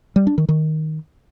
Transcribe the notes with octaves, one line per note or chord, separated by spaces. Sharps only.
G3
D4
D#3
D#3